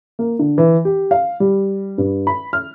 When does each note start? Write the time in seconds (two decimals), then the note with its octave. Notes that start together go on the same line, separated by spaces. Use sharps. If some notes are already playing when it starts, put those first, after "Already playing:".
0.19 A#3
0.39 D3
0.58 E3
0.85 G4
1.11 F5
1.40 G3
1.98 G2
2.27 B5
2.53 F6